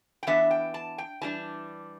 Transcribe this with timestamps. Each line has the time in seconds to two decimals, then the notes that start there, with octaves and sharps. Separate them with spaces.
0.23 G5
0.27 E3 B3 D4 E5
0.51 G5
0.74 A5
0.98 G5
1.22 E3 G3 D4 A5